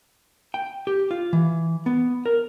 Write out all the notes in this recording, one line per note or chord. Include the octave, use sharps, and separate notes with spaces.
G5
G4
F4
E3
B3
A#4